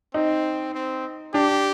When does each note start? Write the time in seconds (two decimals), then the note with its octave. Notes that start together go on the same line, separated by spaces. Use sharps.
0.14 C4 D#4
0.74 C4
1.34 D4 G4